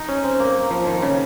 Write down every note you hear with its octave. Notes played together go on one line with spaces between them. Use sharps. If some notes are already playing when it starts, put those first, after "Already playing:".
Already playing: D#4
C#4
C4
A#3
F3
D#3
C#3